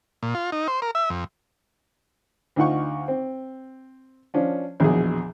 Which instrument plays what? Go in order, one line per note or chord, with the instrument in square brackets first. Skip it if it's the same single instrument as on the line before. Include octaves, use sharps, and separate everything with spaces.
[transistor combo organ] A#2
F4
D#4
C5
A#4
E5
F2
[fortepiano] D2 D#4 F4 F#5 C#6
C4
F3 C#4 D4
A#1 E2 B2 G#4